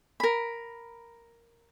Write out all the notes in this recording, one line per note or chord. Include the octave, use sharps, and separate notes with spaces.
A#4 B5